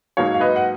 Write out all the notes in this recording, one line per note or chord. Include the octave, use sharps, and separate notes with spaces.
G#2 F#3 A#3 D#4 C#5 F5
F5
B4 D#5
F#5